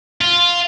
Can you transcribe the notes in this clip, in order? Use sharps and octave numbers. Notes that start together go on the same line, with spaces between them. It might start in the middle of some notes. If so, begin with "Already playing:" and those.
F4